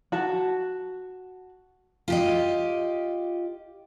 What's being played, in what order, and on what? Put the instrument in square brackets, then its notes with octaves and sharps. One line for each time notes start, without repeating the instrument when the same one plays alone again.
[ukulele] F#4 A5
[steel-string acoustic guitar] F4 G4 D#5